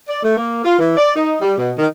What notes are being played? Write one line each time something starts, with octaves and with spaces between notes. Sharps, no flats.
D5
A3
A#3
F4
E3
D5
D#4
G3
B2
D#3